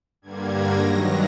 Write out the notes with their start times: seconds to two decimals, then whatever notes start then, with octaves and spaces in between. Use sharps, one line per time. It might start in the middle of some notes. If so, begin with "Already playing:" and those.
0.22 G2 D3 G3 A#3 G#6
0.50 A#6
0.79 G2 D#3 F#3